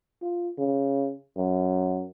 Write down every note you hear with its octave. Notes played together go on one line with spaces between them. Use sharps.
F4
C#3
F#2